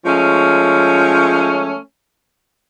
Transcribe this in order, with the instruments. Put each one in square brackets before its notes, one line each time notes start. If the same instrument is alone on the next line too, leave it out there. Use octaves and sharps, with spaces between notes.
[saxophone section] F3 G#3 A3 C#4